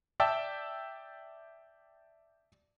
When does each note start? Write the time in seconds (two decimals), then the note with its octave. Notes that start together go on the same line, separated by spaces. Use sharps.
0.20 D5 E5 G5 A5 E6